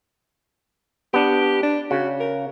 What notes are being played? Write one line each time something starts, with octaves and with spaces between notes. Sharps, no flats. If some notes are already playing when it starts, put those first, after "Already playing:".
B3 D4 G4
D4
C#3 F#4
A#4